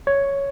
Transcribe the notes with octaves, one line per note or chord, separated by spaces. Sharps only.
C#5